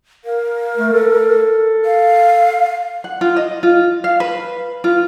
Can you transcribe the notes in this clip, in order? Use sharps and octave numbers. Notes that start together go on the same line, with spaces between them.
A#4 F5
A3
A4
F5
F#5
F4
D#5
F4
F5
B4
F4